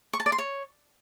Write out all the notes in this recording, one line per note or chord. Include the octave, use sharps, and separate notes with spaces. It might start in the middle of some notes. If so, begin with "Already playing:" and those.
C#6
A5
D5
C6
C#5